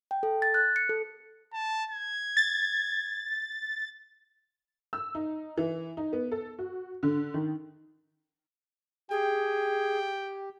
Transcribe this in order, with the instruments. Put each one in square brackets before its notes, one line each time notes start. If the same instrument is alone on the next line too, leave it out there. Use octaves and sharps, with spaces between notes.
[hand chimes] G5
A4
A6
F#6
C#7
A4
[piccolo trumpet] A5
G#6
[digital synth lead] A6
[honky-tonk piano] E6
D#4
E3
D#4
B3
A4
F#4
D3
D#3
[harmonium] G4 [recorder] G#4 [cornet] G5